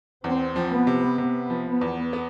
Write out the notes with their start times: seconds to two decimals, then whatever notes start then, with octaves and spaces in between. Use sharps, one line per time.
0.24 E2 C4
0.56 F3
0.70 B3
0.87 C3
1.18 C3 B3
1.50 F3
1.66 B3
1.81 E2
2.13 B3